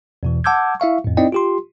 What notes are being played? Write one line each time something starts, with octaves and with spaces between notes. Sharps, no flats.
E2 B2 E3
F#5 A5 D6 E6 G6 G#6
E4 E5 F5 C#6
F2 A2
C4 D#4 E4 D5 D#5 G5
F4 G4 C6